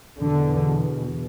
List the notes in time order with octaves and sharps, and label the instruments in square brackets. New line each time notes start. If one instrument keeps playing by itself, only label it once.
[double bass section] E2 B2 D3